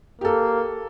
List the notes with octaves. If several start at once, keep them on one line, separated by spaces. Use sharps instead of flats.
A#3 G4 A4